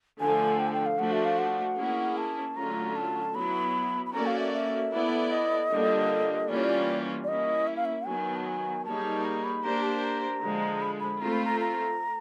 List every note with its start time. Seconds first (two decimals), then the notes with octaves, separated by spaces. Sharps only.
0.20 D3 F3 A3 G#5
0.59 G5
0.68 G#5
0.73 G5
0.86 F5
0.99 F3 A3 D4 F#4 F#5
1.12 E5
1.25 F5
1.38 F#5
1.78 A#3 C#4 E4 G#4
2.17 A5
2.56 D3 F#3 A3 C#4 F4 A#5
2.96 A5
3.35 F#3 B3 E4 B5
4.06 B5
4.13 A#3 C#4 F#4 A4 D5 A#5
4.26 F5
4.39 E5
4.53 E5
4.92 B3 E4 A4 D5
5.31 D#5
5.71 D3 G3 A#3 D4 F4
6.49 E3 G3 A#3 C#4 F4 D5
6.56 C#5
6.64 D5
7.24 D5
7.28 A#3 C#4 E4 D#5
7.67 E5
7.76 F5
7.85 E5
8.06 D#3 F#3 B3 G#5
8.36 A5
8.46 G#5
8.85 G3 A#3 D#4 G#4 C#5 A5
9.25 A#5
9.44 B5
9.64 A#3 D4 G4 C5 A#5
9.83 A5
10.03 A#5
10.42 D3 F3 G#3
10.82 B5
11.00 B5
11.21 A3 C4 F4 A#5
11.33 B5
11.45 A#5
11.61 A#5